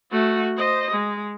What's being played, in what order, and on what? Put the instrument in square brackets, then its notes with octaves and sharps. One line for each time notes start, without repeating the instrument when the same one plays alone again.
[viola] A3 F#4
C5 D#5
G#3